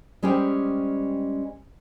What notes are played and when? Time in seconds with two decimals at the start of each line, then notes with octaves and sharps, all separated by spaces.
0.23 G3 G#3 C#4 G4 C5 G5